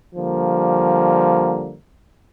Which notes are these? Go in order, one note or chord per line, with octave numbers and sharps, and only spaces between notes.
D3 F3 G3 A#3